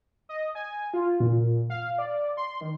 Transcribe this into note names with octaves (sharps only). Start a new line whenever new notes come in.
D#5
G#5
F4
A#2
F5
D5
C6
D#3